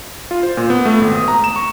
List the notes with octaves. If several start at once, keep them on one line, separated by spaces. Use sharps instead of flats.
F4
C5
A#2
B3
A3
G#1
D#6
A#5
E7
C#6